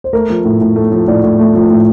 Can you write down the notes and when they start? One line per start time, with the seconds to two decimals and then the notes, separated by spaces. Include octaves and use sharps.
0.04 C5
0.13 A3 A#4
0.30 F3
0.45 A2
0.61 A2
0.76 A3
0.92 F3
1.08 A2 D5
1.24 A2
1.39 A3
1.55 F3
1.70 A2